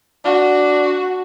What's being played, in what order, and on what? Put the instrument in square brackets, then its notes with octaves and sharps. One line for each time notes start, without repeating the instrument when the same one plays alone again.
[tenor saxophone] D4 [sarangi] F#4